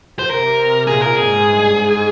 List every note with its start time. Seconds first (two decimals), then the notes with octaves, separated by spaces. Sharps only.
0.19 C5
0.30 C3 A#4
0.87 A#2 G#4
1.02 A#4
1.16 G#2 G#4
1.45 G2
1.73 G#2